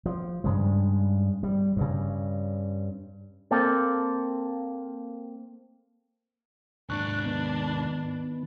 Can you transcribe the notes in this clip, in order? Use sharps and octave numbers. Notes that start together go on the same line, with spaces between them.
F3
G2 C#3 G#3
G3
G2 C#3
A#3 C4 A4
D#2 G#2 D4 C#6 F#6
D#3 B3